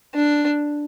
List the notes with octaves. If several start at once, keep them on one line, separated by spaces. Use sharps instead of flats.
D4